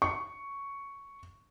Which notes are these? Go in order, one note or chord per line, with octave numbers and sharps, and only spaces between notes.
C#6